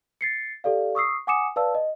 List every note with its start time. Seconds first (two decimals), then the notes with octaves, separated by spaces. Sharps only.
0.21 A6 C7 C#7
0.64 G4 A4 D5 F5
0.95 C#6 D#6 E6 C7
1.27 F#5 G#5 D6 D#6 C#7 E7
1.56 B4 D5 F5 A5 E6
1.75 D#5